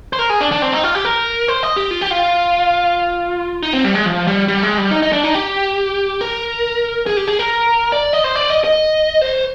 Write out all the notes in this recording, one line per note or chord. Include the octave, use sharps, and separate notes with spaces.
C5
A#4
G#4
D4
D4
C4
D#4
F4
G4
A#4
C5
D#5
G4
F4
G4
F4
D#4
C4
G3
G#3
F3
G3
G3
G#3
G3
D#4
D#4
D4
D#4
G4
A#4
G#4
G4
G#4
A#4
D5
D#5
C5
D5
D#5
D#5
C5